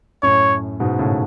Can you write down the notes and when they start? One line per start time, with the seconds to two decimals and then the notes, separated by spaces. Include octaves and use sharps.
0.23 F#2 A2 C#5
0.80 G#2 B2
0.99 A2 C#3